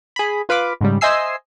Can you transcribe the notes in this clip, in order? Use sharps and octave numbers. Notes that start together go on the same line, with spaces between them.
G#4 B5
F4 B4 F5 B5 D6
G#2 C#3 G3
C5 D#5 E5 G#5 E6 C7